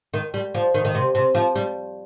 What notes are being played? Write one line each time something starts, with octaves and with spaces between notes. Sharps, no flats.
D#3
G3
F3
D#3
D#3
C3
C3
F3
G3